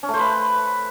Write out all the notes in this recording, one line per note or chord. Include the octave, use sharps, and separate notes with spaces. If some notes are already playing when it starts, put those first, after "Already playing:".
C#4
A3
C5
B4